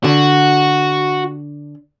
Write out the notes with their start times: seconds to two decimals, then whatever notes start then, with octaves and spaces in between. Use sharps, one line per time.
0.04 D3 F#4